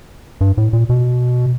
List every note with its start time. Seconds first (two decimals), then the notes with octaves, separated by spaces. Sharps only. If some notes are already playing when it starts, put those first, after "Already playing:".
0.41 G2
0.57 A2
0.73 A#2
0.89 B2